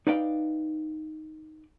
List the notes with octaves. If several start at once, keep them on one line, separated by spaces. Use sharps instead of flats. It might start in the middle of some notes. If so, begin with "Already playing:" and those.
D#4 B4 D5 F5 G5